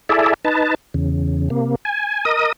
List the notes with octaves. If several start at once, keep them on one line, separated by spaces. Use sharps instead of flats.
E4 G#4 A4 D5 E5
D#4 B4 A5
E2 C#3
C3 A#3
G#5
A#4 D#5 D#6